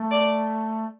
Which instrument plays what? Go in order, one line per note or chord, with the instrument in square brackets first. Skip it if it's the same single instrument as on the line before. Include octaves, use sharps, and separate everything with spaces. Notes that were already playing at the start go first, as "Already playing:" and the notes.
Already playing: [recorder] A3
[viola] D5